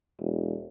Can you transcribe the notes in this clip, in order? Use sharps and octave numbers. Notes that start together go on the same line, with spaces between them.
E1